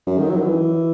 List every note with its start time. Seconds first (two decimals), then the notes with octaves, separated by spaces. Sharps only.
0.07 F#2
0.19 D#3
0.30 F#3
0.37 D#3
0.42 E3